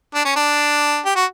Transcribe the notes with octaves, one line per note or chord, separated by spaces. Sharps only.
D4
C#4
D4
G4
F#4